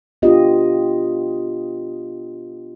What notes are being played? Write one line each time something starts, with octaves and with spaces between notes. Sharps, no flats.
B3 D4 F4 G4 D#5